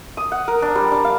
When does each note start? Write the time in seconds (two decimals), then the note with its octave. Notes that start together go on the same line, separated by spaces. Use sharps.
0.17 D#6
0.32 F#5
0.48 A#4
0.62 D4
0.75 G3
0.92 D4
1.05 F5